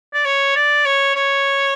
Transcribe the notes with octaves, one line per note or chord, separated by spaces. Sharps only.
D5
C#5
D5
C#5
C#5